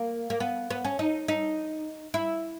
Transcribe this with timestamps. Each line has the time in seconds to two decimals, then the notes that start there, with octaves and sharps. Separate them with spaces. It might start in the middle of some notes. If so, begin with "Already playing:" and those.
Already playing: A#3
0.30 A#3
0.40 B3
0.70 B3
0.85 C#4
0.99 D#4
1.28 D#4
2.14 E4